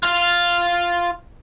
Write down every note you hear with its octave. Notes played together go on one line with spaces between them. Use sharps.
F4 F5